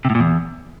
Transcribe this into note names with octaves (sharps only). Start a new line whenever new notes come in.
C3
A2
A#2
E2